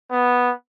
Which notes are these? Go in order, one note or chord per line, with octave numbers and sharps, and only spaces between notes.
B3